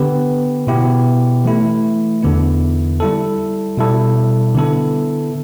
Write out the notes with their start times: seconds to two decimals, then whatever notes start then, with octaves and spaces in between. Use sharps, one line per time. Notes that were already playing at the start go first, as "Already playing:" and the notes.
Already playing: D3 B3 G4 B4
0.67 B2 B3 E4 G4
1.44 E3 A3 E4
2.23 E2 D3 B3 E4
3.00 G3 E4 A4
3.77 B2 G3 E4 A4
4.54 D3 B3 E4 A4